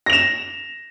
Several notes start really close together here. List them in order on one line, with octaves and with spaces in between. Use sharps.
A#6 F7 E7